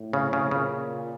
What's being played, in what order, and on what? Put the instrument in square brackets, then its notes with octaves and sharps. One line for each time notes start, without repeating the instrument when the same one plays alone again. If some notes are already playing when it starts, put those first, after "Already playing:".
Already playing: [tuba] A2
[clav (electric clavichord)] C#3
C#3
[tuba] A#2 [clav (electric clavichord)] C#3